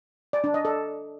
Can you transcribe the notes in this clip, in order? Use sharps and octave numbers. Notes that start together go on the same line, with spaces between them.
D5
D4
D#5
A4